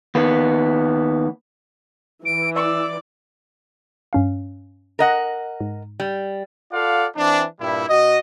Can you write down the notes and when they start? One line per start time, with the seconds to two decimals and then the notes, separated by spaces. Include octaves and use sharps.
0.15 D#2 B3
2.25 E3 D7
2.55 D5 D6 E6
4.13 G2 C#4 F5
4.99 A#4 D#5 F#5
5.60 G#2
6.00 G3
6.72 F4 A4 D5 F5 F#5
7.16 E3 C4 D4
7.60 G2 A#2 G3 E4
7.89 B2 F#4 D#5